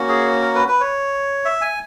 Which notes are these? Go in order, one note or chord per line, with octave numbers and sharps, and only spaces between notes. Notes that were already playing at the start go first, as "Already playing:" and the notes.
Already playing: A#3 C#4 F#4
G#4
A#4
B4
B4
C#5
E5
G#5